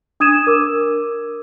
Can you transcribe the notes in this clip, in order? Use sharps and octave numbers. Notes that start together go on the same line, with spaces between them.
D4 D#6 G#6 D#7 E7
A#4 D6 E6